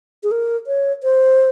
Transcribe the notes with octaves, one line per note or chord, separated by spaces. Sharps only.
G#4
A#4
C#5
C5